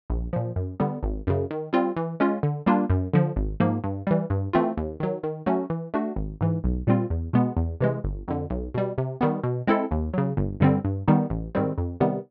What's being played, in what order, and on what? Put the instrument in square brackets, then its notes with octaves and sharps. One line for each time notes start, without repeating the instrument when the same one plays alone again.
[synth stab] A#1
A#2 F3
F#2
D3 G3 B3
G#1
F#2 C#3
D#3
G3 C4 F4
E3
G#3 C#4 F4
D3
G3 A#3 D4 F4
F#2
D3 F3
G#1
G#2 F3 A#3
G2
E3 G3
G2
E3 A3 C4 F4
D#2
D#3 F#3
D#3
F#3 A3 C#4 F#4
E3
A3 D4 F#4
G#1
G#2 E3
B1
A#2 G3 C4 F4
E2
B2 G#3 B3
E2
C3 E3 G#3
G1
F2 D3
B1
B2 G3
C3
D#3 G3 B3
B2
G#3 C4 E4 A4
D#2
C#3 F#3
G1
G2 D3 G3 C4
G2
D#3 G3 B3 D#4
A1
G#2 D#3 G3 C4
F2
C3 D#3 G3 B3